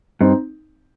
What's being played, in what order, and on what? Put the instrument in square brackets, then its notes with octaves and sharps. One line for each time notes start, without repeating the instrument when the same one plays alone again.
[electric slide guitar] G2 [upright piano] C4 D#4